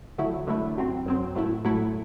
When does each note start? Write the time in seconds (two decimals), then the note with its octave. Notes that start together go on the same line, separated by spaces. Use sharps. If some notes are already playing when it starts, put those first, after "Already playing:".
0.18 D3 F#3 A3 E4
0.47 D3 F#3 A3 E4
0.77 F#2 F#3 C4
1.06 F#2 F#3 C4
1.35 A2 F#3 A3 E4
1.65 A2 F#3 A3 E4